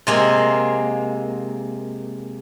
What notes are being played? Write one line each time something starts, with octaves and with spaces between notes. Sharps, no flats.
C3 G#3 A#3